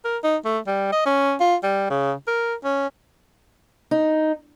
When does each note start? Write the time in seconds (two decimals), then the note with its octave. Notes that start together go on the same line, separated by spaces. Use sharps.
0.05 A#4
0.24 D#4
0.45 A3
0.67 G3
0.92 D#5
1.06 C#4
1.40 F4
1.63 G3
1.90 C#3
2.28 A#4
2.64 C#4
3.91 D#4